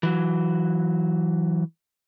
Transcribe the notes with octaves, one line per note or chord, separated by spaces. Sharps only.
E3 F#3